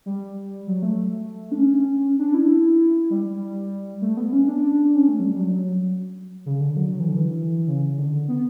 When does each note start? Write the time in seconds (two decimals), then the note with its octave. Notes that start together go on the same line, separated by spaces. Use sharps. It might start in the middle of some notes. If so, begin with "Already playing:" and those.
0.06 G3
0.67 F#3
0.82 A3
1.52 D4
1.58 C#4
2.19 D4
2.34 E4
3.10 G3
3.25 G3
4.02 A3
4.17 B3
4.33 C#4
4.48 D4
4.63 D4
4.94 C#4
5.08 A3
5.19 F#3
5.24 G3
5.34 G3
5.39 F#3
5.55 F#3
6.46 C#3
6.61 D3
6.76 F#3
6.92 F#3
7.00 E3
7.08 D3
7.17 E3
7.68 C#3
7.98 D3
8.28 B3